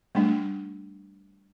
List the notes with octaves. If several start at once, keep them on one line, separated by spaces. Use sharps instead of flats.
G3 A3 D4